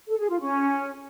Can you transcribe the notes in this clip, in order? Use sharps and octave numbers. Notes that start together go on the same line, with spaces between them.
A4
G#4
F4
C#4